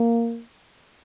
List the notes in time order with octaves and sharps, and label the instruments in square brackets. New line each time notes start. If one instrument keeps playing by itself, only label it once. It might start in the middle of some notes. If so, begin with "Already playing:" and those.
Already playing: [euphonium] A#3